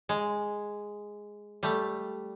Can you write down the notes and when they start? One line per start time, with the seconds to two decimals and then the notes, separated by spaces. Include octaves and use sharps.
0.09 G#3
1.63 G3 A3